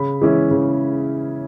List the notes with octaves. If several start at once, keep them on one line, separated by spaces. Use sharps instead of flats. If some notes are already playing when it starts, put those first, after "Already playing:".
Already playing: C#3 B5
E3 G#3 C#4 E4
C#3